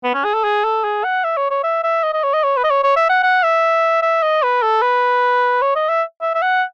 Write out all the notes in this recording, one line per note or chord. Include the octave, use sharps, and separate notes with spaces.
B3
C#4
G#4
A4
G#4
A4
G#4
F#5
E5
C#5
C#5
E5
E5
D#5
D#5
C#5
D#5
C#5
B4
D#5
C#5
C#5
E5
F#5
F#5
E5
E5
D#5
B4
A4
B4
C#5
D#5
E5
E5
E5
F#5